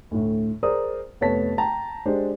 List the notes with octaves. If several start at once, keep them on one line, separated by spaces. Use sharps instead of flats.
D2 A2
G#4 A#4 C5 D5 D#6
F1 A3 B3 C#5 A5 B6
G5 A5 A#5
G#3 D4 G4 C5